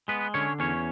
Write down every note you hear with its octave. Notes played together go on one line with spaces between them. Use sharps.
G#3 B3 B4
D3 C#4 C#5
E2 C#4 C#5